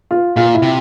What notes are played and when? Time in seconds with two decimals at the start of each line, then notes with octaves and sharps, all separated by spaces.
0.11 F4
0.36 A#2 F4
0.54 E4
0.62 C3